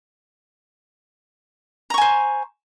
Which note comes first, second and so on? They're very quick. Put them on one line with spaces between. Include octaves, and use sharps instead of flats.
A#5 C#6 G#5 C5